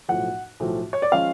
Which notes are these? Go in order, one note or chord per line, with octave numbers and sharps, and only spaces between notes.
B1 A2 F3 F#5
B1 A2 F3
C#5
D5
F3 G#3 C#4 F5